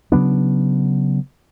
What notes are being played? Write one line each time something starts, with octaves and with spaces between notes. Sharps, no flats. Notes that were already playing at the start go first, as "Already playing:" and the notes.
C#3 F#3 B3 D4